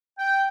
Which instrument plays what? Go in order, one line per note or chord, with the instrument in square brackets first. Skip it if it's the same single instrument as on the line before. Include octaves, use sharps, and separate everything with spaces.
[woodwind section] G5